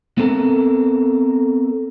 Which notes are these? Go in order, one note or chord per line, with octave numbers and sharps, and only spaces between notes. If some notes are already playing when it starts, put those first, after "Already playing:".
B3 C4 A4 A#4